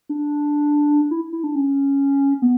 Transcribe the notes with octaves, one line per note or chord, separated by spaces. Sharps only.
D4
E4
E4
D4
C#4
B3